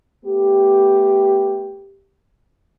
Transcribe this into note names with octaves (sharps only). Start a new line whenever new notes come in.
A3 B3 G4